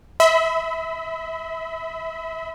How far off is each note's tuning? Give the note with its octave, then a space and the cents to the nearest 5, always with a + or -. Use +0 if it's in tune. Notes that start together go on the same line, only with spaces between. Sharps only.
E5 -30 B5 +30